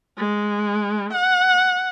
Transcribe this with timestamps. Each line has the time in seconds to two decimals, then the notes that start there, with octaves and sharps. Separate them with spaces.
0.18 G#3
1.13 F#5